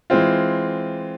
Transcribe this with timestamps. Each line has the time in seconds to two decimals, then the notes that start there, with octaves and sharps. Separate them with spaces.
0.10 E3 G#3 C4 F4